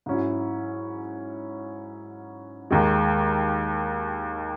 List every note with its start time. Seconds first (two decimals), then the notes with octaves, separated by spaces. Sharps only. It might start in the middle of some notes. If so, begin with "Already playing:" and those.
0.06 G#2 F#3 C#4 E4
2.71 D#2 D#3 G#3